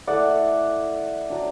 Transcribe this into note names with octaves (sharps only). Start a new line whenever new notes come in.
A3 E4 D5 F#5
F#3 D4